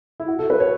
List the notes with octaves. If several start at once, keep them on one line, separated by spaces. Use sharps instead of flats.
E4
F#4
A4
B4
C#5